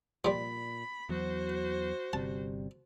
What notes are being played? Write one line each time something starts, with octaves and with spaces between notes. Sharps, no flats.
A#2 F3 G3 B5
E2 F#3 F#4 C5
G1 C3 G3 A5